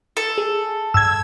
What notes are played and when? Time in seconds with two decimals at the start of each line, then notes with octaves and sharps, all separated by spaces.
0.17 A4
0.38 G#4
0.94 G2 E6 G#6